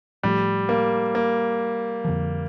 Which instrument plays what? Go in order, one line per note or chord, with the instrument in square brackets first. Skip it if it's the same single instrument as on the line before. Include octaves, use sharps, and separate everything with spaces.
[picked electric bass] A2 F3 A3 [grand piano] G3
[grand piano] A#3
A#3
[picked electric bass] F2 D3 F3